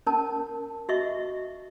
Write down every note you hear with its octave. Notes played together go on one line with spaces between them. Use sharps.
C#4 A#4 A5
F#4 D#5 E5 C#6